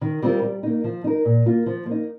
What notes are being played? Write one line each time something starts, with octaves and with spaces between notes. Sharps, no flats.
D#3
G3 C4 F4 A#4
G3
A#3 D#4
F3
D#4 A#4
A#2
A#3 F4
F3
A#3
D#4